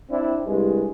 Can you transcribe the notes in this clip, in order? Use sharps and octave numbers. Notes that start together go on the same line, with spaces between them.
C4 D4 E4
C2 G2 G#3